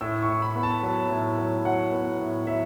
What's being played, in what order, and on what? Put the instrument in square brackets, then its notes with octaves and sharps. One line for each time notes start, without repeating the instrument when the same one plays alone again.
[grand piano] A2 E6
C#6
A2
B5
B3
A5
F#3
A2
F#3
F#3 F#5
B3
A2
F#3 E5